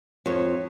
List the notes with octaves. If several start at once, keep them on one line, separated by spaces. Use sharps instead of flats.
F2 C#5